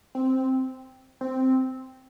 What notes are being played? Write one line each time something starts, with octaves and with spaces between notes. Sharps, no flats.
C4
C4